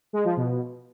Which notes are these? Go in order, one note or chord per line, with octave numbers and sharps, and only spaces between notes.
G#3
F3
B2